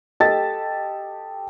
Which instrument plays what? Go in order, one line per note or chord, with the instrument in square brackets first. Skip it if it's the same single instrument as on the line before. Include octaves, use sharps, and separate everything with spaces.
[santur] G4 A4 A5 [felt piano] D#5 A6